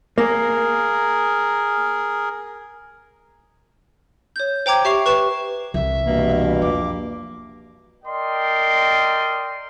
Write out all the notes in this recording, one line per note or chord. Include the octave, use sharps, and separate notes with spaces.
A#3 G#4 A#4
C#5 G6
C5 G5 A#5 D6 G#6
G4 E5 C#6 C7 F7
B4 C#6 E7
C2 E3 E5
G2 B2 A#3
F2 D6
A#4 D5 D#5 G5 C6